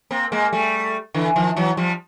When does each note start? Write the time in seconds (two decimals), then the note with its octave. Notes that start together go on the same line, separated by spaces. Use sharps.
0.11 A#3 C4
0.32 G#3 A#3
0.53 G3 A3
1.14 D3 E3
1.36 D#3 F3
1.56 E3 F#3
1.77 F3 G3